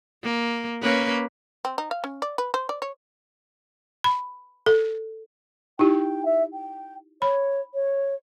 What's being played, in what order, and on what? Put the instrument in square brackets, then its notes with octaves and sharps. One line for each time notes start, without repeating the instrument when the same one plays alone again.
[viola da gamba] A#3
A#3 C#4 B4
[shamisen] C4
D#4
F5
C#4
D5
B4
C5
D5
C#5
[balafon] B5
A4
[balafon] D#4 E4 G4 [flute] G5
[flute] E5
G5
[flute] C#5 [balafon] B5
[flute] C#5